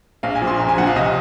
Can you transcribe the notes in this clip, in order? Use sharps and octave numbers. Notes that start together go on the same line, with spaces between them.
A#1 F5
G#5
A#2 F3
C6
A#1 A#5
G#5
A#2 F3 F#5
F5
C2 D#5